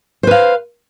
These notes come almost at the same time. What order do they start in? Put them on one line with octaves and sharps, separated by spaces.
C5 B4 F5